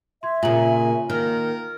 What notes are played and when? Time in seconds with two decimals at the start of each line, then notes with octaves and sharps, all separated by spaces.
0.23 E5 C6 G#6
0.43 A#2 C#3 F4 G#5 F#7
1.10 D#3 A#3 A#4